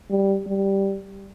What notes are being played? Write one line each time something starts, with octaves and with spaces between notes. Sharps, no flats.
G3
G3